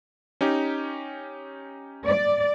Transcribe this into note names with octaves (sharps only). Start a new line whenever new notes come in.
C#4 D#4 G4
D5